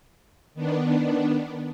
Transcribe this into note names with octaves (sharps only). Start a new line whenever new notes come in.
D#3 B3 D4